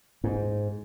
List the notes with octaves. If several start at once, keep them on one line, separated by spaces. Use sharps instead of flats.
G#2